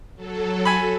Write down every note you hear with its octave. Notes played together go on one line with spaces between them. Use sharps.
F#3 A4
G#5 B5